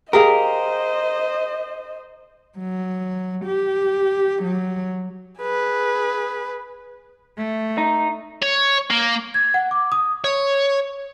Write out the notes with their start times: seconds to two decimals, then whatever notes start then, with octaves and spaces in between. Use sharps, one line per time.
0.13 G4 G#4 A#4 C5 D#5 F5
2.59 F#3
3.45 G4
4.43 F#3
5.39 G#4 B4
7.37 A3
7.78 D#4
8.42 C#5
8.91 A#3
9.34 G#6
9.54 F#5
9.71 D6
9.92 D#6
10.24 C#5